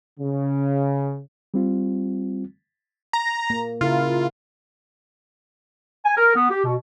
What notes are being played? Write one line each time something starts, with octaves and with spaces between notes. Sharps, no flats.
C#3
G3 C4 F4
A#5
A#3
C#3 E4 F4 A#4
G#5
A#4
B3
G4
B2